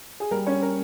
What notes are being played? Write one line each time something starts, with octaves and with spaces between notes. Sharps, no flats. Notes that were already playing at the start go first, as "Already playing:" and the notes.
G#4
G3 A#4
C#4 C#5
C#4 A#4